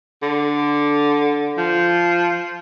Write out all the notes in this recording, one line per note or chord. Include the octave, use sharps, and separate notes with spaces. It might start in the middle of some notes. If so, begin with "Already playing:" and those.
D3
F3